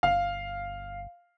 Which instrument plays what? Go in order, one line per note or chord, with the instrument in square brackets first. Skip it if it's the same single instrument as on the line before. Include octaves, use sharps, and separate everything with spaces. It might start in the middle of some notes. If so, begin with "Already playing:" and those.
[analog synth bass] G1 [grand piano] F5